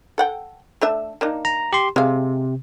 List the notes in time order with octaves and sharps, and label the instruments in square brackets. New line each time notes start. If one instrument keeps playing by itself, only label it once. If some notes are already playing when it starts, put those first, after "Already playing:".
[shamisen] A4 F#5 G5
A3 D4 E5
A#3 D4 D#4
[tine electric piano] A#5
G4 C6
[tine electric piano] C3 [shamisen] G#3 F5